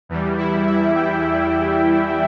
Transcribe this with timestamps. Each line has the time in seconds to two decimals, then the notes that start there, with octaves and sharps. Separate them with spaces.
0.09 E2 E3 G3
0.38 E4
0.66 E5
0.95 G5